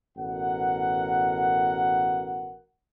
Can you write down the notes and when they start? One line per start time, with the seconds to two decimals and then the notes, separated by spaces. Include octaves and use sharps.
0.17 A1 B2 A#4 F#5